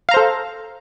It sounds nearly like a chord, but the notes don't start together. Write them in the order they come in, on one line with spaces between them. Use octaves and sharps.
F5 A#5 C5 A4